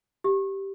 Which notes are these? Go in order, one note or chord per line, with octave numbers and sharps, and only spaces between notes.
G4